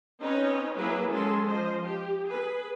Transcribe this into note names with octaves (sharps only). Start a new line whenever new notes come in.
C4 C#4 D#4 B4 C#5 D#5
F#3 A#3 E4 G#4 B4
F#3 G#3 C#4 G#4 A4 C6
F3 C5 D#5
G4
G#4 B4